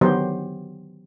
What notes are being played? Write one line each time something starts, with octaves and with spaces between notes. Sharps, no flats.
D3 D#3 F#3 B3 G4 C5